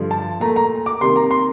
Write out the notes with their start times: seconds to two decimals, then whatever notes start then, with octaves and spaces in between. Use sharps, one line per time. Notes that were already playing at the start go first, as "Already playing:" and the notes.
Already playing: G2 D3 F3
0.11 A5
0.40 A#2 A3 A#5
0.56 A#5
0.86 D6
1.01 C3 D#3 G3 A#3 C6
1.16 A#5
1.31 C6